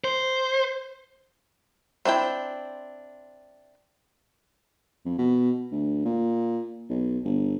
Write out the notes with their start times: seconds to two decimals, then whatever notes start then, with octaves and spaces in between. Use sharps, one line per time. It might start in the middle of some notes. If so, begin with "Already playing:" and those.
0.04 C5
2.05 C4 D4 E4 G5
5.05 F2
5.18 B2
5.71 D2
6.05 A#2
6.89 B1
7.25 G1